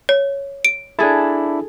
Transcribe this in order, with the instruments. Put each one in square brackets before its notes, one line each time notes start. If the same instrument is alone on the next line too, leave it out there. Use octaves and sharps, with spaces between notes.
[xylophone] C#5
D7
[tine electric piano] D4 E4 [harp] G#4 A4